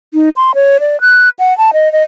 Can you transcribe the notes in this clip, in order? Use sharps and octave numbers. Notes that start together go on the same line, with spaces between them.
D#4
C6
C#5
D5
F#6
F#5
A5
D#5
D#5